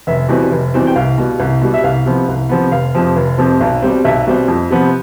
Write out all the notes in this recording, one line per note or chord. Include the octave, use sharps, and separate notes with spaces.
F1 E5
E2 B2 G3 C4
F1
E2 B2 G3 C4
G5
C2 F5
B2 G3
C2
B2 G3
E5
C2 F5
C3 F3 B3
C2
C3 F3 B3
F1 F5
F2 C3 F3
F1
F2 C3 F3
B1
B2 G3 C4
B1 E5
B2 G3 C4
F2
C3 F3 B3